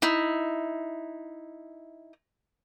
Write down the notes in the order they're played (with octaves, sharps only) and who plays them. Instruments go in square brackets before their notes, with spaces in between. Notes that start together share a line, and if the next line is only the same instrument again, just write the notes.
[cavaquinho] D#4 E4